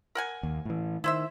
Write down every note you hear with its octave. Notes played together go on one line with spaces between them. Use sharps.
A#4 F#5 G#5
D#2
A2 E3
D#3 E4 C5 E5